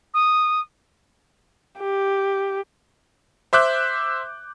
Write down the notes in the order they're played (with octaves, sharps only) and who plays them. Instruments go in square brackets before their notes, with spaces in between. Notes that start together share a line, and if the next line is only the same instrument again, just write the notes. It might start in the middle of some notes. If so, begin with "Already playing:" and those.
[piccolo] D#6
[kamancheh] G4
[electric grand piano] C5 E5 D6 F#6 G6